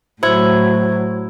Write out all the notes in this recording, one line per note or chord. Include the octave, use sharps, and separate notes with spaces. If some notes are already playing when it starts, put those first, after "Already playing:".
A2 F#3 E4 C5 G#6